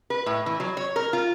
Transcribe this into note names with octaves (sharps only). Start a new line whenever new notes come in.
B4
A2
E3
F#3
C#5
A#4
F4